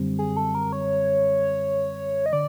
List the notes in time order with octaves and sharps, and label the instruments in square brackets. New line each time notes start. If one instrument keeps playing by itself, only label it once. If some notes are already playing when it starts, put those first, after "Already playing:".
Already playing: [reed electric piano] F#2 D3 G3 C4
[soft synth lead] G#4
A4
A#4
C#5
D#5
[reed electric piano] D3 [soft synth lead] D5